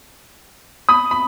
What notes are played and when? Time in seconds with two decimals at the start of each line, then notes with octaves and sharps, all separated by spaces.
0.89 B5 D#6
1.11 B5